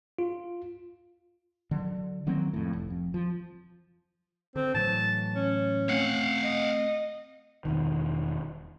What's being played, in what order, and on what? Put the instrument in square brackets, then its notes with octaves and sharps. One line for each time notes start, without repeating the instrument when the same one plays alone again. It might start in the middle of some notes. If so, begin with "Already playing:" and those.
[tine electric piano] F4
[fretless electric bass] D3 F#3
D#3 F#3 A#3 C4
F2 A2
F1
F2
F3
[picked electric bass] D3 [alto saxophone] C4
[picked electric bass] A2 E3 F#3 [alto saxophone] A5
[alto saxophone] C#4
[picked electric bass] A3 C4 [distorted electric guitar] F5 F#5
[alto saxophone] D#5
[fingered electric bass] E1 B1 D#3